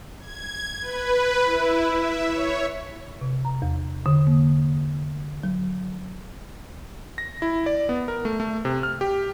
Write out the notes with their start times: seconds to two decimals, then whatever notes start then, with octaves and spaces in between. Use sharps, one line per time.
0.20 G#6
0.81 B4
1.45 E4
1.90 E5
2.27 C#5
3.21 C3
3.45 A#5
3.62 E2
4.06 D3
4.27 A#3
5.43 F#3
7.18 A#6
7.42 E4
7.66 D5
7.89 B3
8.08 A#4
8.25 A3
8.40 A3
8.65 C3
8.83 F6
9.01 G4